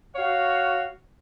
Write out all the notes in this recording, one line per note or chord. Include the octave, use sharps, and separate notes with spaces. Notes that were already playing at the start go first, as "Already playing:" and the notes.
F#4 C#5 F5